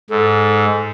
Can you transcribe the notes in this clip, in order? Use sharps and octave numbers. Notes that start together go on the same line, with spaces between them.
G#2 A4